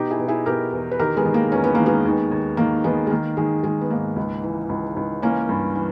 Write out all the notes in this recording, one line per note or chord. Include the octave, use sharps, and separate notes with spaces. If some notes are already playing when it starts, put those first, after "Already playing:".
Already playing: B2 D#4 G4
E4 G#4
B2
E4 G#4
B2 G4 A#4
E2
B4
D#3 G4 A#4
G#3 B3
D#3
A#3
E2 C#4
B3
D#3 A#3
G#3 B3
D#2
D#2
D#3 A#3
D#3 G#3 B3
G#3
D#3 A#3
D#3 G#3
D#3 G#3
B3
G#2 A#3
C#2
E3
C#2
C#2
E3 A#3 C#4
G2
E3